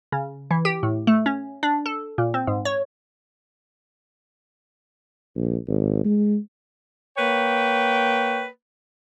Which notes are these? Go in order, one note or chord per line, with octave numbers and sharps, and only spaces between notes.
C#3
E3
G4
A2
A3
C#4
D4
A4
A#2
C4
G#2
C#5
A#1
G#1
G#3
A#3 B4 C#5 G5